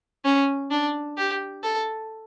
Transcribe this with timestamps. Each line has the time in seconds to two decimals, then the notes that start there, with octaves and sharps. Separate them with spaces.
0.24 C#4
0.71 D4
1.18 G4
1.63 A4